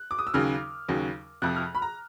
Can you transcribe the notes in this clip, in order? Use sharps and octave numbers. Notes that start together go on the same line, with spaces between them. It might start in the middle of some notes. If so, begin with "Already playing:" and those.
Already playing: F#6
D6
D#6
E6
D#2 C#3 F#3 F6
D#2 C#3 F#3
F2 C3 F3 F#6
F6
B5
A#5